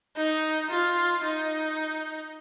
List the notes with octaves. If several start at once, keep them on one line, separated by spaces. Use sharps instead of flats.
D#4
F4
D#4